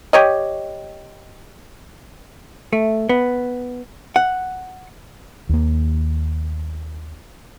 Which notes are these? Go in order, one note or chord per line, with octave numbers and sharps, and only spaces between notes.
G4 C#5 D#5
A3
B3
F#5
D#2 A#3